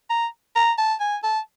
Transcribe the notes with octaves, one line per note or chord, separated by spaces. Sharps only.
A#5
A#5
A5
G#5
A5